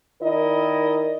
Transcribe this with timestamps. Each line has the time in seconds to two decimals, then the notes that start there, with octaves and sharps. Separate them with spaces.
0.22 D#3 E4 A#4 D5 D#5